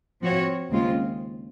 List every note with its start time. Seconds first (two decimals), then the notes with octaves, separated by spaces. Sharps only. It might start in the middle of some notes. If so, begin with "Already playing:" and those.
0.22 F3 C4 F#4 C#5
0.70 D#2 C#3 G#3 C4 F4